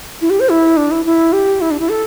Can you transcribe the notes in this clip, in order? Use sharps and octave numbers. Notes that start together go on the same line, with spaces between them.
E4
G4
C5
E4
D4
E4
E4
G4
E4
D4
E4
A4